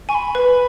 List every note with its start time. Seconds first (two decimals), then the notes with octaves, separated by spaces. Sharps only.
0.09 G#5 C#6
0.14 B5
0.35 B4